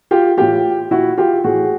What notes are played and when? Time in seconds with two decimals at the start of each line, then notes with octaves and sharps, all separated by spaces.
0.11 F4 G4
0.37 A2 E3 F4 G4
0.91 A#2 E4 F#4
1.18 F4 G4
1.44 A2 E3 F#4 G#4